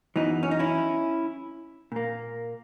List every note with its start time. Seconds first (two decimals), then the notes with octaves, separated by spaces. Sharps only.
0.16 F#2 E3 B3 D#4
0.43 C#4
0.51 D#4
0.59 C#4 E4
1.92 A#2 A#3